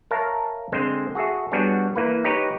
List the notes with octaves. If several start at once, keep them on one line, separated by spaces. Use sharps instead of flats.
A#4 C#5 E5 F5 A5 A#5
D3 G#3 C4 G#4 C5
F#4 G#4 A4 E5
G3 B3 D4 F#4 G#4 C#5
E3 A#3 B4
D#4 G4 B4 C#5